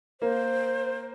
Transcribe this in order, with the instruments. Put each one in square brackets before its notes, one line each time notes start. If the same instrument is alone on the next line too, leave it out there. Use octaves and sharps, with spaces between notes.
[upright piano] A#3 [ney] C5